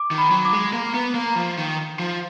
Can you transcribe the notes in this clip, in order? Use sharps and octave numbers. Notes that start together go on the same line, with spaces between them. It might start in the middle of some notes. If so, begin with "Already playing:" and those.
Already playing: D6
D#3
B5
F#3
D6
G#3
A#3
B3
A#3
F3
D#3
F3